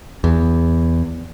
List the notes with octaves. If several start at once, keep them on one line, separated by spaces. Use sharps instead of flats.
E2